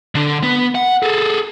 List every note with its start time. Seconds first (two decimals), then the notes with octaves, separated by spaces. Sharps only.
0.15 D3 D4
0.43 B3
0.75 F#5
1.03 G#4 A4